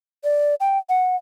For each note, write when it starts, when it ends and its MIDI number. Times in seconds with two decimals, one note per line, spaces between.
0.24 0.55 74
0.60 0.78 79
0.89 1.16 78